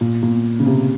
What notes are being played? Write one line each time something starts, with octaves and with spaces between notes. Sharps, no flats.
A#2
A#2
C#3
C3